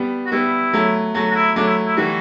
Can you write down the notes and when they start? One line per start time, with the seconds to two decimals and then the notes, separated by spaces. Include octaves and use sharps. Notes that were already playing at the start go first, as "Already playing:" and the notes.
Already playing: G3 B3
0.26 F#4
0.32 G3 B3 E4
0.73 F#3 A3
1.14 F#3 A3 F#4
1.31 F#4
1.35 E4
1.56 F#3 A3 D4
1.67 E4
1.87 E4
1.97 E3 G3 F#4